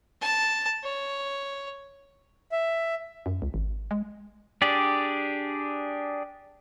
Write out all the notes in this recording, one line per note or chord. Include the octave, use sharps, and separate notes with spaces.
A5
C#5
E5
F#2
C#2
G#1
G#3
D4 G4 G#4 D5